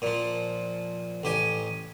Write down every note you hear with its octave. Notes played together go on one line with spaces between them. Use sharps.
A#2 F3
A1 G4 G#5